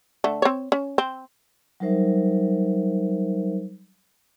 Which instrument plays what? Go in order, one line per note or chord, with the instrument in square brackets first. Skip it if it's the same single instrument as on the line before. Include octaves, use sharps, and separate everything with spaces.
[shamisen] D3 A3
C4 C#5
C#4
C4
[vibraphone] F#3 G3 D#4 A#4 C5 E5